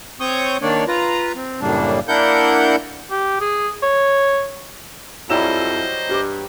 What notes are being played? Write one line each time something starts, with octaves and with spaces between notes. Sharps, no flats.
C4 C#5 C#6 D#6 G6
D#3 A#3 D4 C#5 D5
F4 B4 A#5
C4
F#2 A2 C#3 G3 A#3 D4
A#3 D4 E4 A#4 F#5 G6
G4
G#4
C#5
F2 F#3 G3 E4 C5 D#5 E6 E7
G2 G4 D6